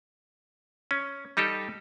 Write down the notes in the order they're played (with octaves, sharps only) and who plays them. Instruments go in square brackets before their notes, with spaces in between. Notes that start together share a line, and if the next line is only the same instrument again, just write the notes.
[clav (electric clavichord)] C#4
G3 D#4 G4 A4